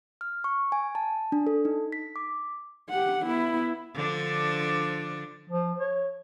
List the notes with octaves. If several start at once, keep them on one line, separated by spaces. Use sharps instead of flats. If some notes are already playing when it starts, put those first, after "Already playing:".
F6
C#6
G#5
A5
D4
A4
D#4
B6
D6
G4 F#5
B3 E4
D3 F3 D4
F3
C#5